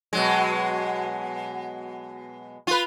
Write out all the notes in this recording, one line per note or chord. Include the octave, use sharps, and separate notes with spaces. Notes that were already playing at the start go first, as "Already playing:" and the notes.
B2 F#3 G#3
F4 B4